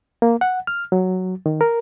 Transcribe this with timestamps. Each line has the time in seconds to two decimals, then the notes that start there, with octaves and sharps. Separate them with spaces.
0.22 A#3
0.41 F#5
0.67 F6
0.92 F#3
1.46 D#3
1.61 A#4